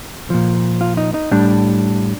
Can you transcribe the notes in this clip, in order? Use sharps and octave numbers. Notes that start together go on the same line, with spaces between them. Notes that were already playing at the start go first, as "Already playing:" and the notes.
A#2 F3
F4
D#4
D#4
A2 G3 D4